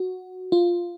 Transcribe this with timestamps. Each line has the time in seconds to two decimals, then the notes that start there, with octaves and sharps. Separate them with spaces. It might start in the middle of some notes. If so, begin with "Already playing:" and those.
Already playing: F#4
0.52 F4